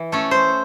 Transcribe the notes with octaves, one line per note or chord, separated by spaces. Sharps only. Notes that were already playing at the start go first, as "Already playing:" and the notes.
Already playing: E3
A3 C#4 A4
C5